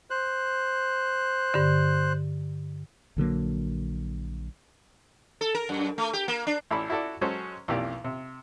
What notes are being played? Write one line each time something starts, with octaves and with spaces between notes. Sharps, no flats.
C5 F#6
G2 D3
A#1 D3 F#3 A#3
A4
A#4
F#2
A3
G4
A#3
D4
A1 E4 A4 D5 B5
E4 F#4 A4 D5
F#3 G#3 C#4 A4 C5
B1 F2 E3 A#3 G4 D5
C3